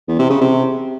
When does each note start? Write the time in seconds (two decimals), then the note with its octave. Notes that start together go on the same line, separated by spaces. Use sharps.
0.08 E2
0.19 C3
0.30 C#3
0.41 C3